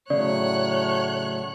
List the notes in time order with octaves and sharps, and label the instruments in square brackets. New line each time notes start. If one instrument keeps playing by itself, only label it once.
[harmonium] A2 F#3 A3 [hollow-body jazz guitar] C#3 [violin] C#5 F#6 [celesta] D5